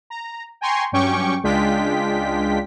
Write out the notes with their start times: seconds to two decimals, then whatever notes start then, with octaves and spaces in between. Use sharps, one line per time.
0.10 A#5
0.61 G5 G#5 A#5 C6 C#6
0.92 G2 F#3 C#4 G5 C#6 D6
1.43 C#2 G#3 D4 F4 G5 B6